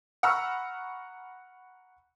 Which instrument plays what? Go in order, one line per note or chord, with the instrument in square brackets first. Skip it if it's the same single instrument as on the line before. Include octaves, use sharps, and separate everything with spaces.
[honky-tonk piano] F#5 A#5 B5 C#6 E6 F6